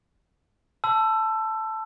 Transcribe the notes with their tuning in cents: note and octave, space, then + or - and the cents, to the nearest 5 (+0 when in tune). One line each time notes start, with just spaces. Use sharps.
A5 +0 C6 -45 E6 +20